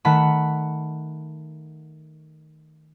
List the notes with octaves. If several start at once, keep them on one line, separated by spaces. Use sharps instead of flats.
D#3 A3 F#5 A5 B5